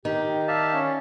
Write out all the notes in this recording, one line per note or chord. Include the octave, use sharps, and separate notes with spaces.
D#3 G4
D5 E5 F5 A5
C#4